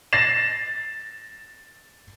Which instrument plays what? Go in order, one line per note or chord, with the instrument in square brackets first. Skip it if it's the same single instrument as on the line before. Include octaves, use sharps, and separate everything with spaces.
[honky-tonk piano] A6 A#6 C7 E7